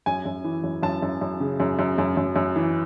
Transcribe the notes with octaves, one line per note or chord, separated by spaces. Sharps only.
F#2 G#5
F#2
E3
F#2
F#2 A5
F#2
F#2
C#3
F#2
F#2
F#2
F#2
F#2
E3